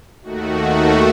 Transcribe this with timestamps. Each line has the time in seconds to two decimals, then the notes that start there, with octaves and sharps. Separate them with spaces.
0.22 D#2 D#3 A3 F#4